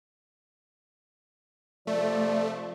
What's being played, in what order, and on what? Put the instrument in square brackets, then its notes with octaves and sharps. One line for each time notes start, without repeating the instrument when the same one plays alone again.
[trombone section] C3 F3 [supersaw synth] A3 [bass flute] D5